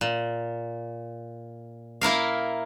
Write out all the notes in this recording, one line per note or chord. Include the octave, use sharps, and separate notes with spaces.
A#2
A#3 E4 A#4 F5